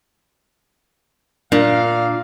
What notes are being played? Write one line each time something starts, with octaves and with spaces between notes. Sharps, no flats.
A#2 D4 F5